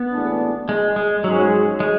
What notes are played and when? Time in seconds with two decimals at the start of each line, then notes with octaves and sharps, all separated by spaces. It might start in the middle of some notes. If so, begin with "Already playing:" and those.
Already playing: B3
0.12 B1 A2 E3 G#3 D4
0.69 G#3
0.96 G#3
1.24 G#2 F#3 G#3 C#4 G#4
1.80 G#3